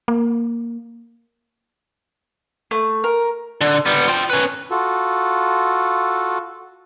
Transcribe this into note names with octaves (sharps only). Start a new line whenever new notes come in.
A#3
A3
A#4
D3
G3 B3
F4 G5
C#4 B4
F4 F#4 A4